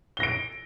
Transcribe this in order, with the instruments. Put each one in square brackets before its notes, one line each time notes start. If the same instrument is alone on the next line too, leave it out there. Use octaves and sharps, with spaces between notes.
[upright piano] G7
A#6
D7